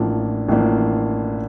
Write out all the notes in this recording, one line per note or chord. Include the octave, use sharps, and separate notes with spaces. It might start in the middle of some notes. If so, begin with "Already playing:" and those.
Already playing: A1 A2 F3 A#3 D4
A1 A2 F3 A#3 D4